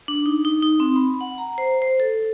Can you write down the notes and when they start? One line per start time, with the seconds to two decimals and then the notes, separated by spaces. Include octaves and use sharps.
0.08 D4
0.26 D#4
0.45 D#4
0.63 D#4
0.80 C4
0.96 B5
1.21 F#5
1.38 A#5
1.58 C5
1.82 C5
2.00 A4